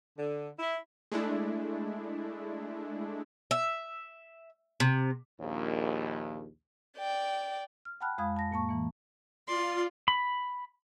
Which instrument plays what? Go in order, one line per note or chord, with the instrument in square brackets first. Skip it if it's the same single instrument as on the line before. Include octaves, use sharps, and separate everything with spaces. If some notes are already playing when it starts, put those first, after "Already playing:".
[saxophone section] D3
E4
[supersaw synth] G#3 A3 D4 E4
[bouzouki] E5
C3
[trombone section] A#1 D#2
[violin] D5 G5
[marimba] F6
F#5 G5 A5 B5 F6 F#6
F2 G#3 F5 B5 D#6 G#6
A5 A#6
A2 A#3 A5 C#6
E3 A#3
[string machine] F4 [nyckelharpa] D5 C6
[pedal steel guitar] B5